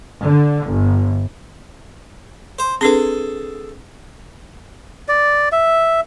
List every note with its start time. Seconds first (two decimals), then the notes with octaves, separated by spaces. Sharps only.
0.22 D3
0.66 G1
2.59 C5
2.81 C4 D4 G#4 A4 B4
5.08 D5
5.52 E5